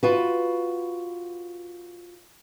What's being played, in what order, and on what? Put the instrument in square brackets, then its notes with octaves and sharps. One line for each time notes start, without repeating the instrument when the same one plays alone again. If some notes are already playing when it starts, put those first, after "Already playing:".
[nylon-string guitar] F4 F#4 B4